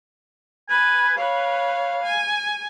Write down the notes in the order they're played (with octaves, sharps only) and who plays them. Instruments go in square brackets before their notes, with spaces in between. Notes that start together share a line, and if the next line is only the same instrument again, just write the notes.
[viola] B4 [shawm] G#5
[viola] B4 C#5 [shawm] F5
[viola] G#5